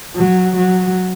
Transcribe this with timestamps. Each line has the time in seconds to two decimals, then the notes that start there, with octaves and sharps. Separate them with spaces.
0.16 F#3
0.56 F#3